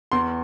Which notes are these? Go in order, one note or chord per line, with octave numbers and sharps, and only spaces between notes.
E2 C6